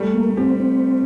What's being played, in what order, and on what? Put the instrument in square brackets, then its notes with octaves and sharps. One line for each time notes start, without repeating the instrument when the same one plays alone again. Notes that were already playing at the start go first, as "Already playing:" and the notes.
Already playing: [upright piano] G3 A3
[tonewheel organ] A#3
[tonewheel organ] C4 [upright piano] G4
[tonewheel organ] C4